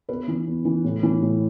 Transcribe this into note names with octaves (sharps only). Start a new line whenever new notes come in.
E2 B4
E3
E2
E3
A2
E3
A2